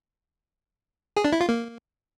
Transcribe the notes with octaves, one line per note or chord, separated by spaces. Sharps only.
G#4
D4
E4
F4
A#3